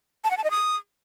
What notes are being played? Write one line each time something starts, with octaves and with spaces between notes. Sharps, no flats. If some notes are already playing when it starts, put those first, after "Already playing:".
A5
F#5
A5
D#5
D#6